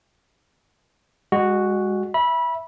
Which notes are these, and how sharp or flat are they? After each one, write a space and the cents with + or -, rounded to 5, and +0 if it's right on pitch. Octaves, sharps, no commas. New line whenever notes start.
G#3 -30 F#4 +0
E5 +0 B5 -20